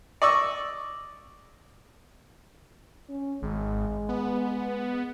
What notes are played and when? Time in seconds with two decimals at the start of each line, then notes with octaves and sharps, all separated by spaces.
0.22 D5 D#5 C#6 E6
3.09 C#4
3.42 G#1 G#3
4.09 B3